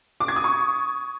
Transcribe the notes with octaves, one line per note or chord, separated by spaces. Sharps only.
D6
G#6
D#6
C#6